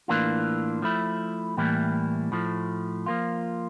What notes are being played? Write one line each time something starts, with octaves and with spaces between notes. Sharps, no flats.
A2 E3 A#3 D4 F4
F3 A3 E4
A2 E3 G3 A#3 E4
A2 F3 A3
F3 A#3 F4